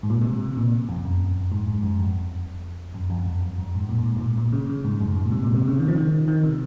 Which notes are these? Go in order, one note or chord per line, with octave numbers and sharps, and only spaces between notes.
G#2
A#2
C3
C3
C3
A#2
F2
F#2
G#2
G#2
F#2
F2
F#2
F2
F#2
F2
F#2
G#2
A#2
G#2
A#2
G#2
A#2
A#2
C#3
C#3
G#2
F#2
G#2
A#2
C3
A#2
C3
C#3
D#3
F3
D#3
D#3
C3